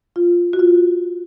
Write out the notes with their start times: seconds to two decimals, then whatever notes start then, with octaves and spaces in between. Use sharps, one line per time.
0.16 F4
0.53 F#4
0.59 F4